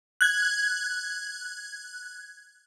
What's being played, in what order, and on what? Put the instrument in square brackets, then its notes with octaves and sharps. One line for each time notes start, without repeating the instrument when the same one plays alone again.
[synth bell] F#6 G#6